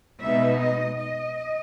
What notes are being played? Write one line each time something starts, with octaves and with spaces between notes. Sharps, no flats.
B2 G#3 B3 D#4 E5
D#5
D#5